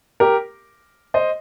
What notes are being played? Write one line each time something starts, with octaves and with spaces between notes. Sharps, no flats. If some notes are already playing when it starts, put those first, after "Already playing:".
G4 A#4
C5 D#5